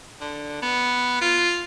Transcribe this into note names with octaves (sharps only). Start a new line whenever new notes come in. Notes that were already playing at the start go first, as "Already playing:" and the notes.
D3
B3
F4